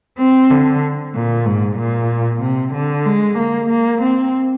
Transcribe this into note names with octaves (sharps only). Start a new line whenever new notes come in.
C4
D3
A#2
G#2
A#2
C3
D3
G#3
A#3
A#3
C4